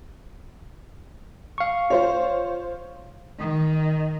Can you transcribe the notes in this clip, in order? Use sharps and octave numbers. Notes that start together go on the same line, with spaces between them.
F5 C#6
F4 C5 C#5
D#3